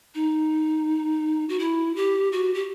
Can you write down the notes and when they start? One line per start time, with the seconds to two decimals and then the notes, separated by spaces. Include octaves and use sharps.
0.15 D#4
1.49 F#4
1.59 E4
1.96 G4
2.32 F#4
2.54 G4